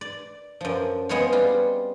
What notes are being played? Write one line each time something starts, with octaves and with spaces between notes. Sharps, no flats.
D5
F#2 F3
G#3 B3 C4 F4 C#5
G3 F4